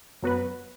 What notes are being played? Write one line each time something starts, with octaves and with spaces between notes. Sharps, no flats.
F#2 F#3 B3 F#4 B4